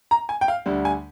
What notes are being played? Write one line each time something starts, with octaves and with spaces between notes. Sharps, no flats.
A#5
G#5
G5
F5
D2 D3 G3
G#5